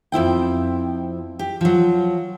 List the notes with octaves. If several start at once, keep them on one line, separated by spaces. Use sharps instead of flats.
F2 C4 E4 G5
G4
F3 F#3